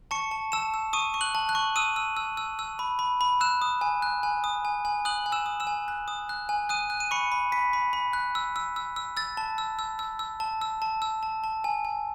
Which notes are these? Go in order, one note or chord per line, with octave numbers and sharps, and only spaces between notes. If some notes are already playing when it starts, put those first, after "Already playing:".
A5 C#6 C#7
A5
A5 E6 E7
E6
C#6 D#6 D#7
C#6
F#6 F#7
A5
F#6 F#7
C#6
D#6 E6 D#7
E6
E6
E6
E6
B5
B5
B5
E6 F#6 E7
D#6
G#5
F#6
G#5
D#6
G#5
G#5
D#6 F#6 F#7
G#5
E6 E7
D#6
E6 E7
G#5
F#6
D#6
F#6
G#5
D#6 F#6 D#7
F#6
D#7
B5 C#6 C#7
B5
B5 B6
B5
B5
F#6
E6
E6
E6
E6
E6 A6
A5
E6
E6
E6
E6
A5
E6
A5
E6
A5
A5
G#5
G#5